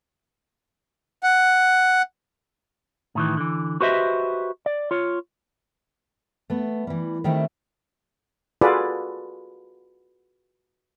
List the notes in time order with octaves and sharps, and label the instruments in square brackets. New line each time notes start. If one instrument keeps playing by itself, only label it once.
[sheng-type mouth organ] F#5
[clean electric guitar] A2 D#3 E3
D3 E3
F#4 G4 B4 C5 D#5 E5
D5
F4 C#5
[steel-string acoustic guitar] A3 B3
E3 G3
D#3 G3 A3 C4 D4 E4
[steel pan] F4 F#4 G#4 A4 B4 D5